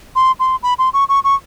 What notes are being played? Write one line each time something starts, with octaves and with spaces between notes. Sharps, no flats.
C6
C6
B5
C6
C#6
C#6
C#6